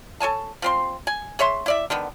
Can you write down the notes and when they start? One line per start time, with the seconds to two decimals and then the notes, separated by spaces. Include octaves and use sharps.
0.20 A4 C#5 G#5 A5
0.62 F3 C4 C6
1.07 G#5
1.39 G#4 C#5 E5 C6
1.66 E4 D5 E5
1.90 D3 D#3 B3